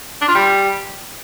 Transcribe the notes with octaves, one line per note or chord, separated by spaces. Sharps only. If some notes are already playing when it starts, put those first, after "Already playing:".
D4
F4
G3